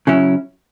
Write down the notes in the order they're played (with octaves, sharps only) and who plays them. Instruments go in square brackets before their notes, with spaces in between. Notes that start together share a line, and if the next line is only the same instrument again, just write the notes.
[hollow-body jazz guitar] C#3 F#3 C#4 E4